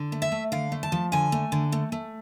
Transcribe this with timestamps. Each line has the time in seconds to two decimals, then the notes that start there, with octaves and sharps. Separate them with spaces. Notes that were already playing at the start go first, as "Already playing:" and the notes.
Already playing: D3
0.12 A3
0.22 E5
0.32 A3
0.52 D3 F5
0.72 A3
0.83 A5
0.92 F3
1.12 D3 G#5
1.32 A3
1.52 D3
1.72 A3
1.92 A3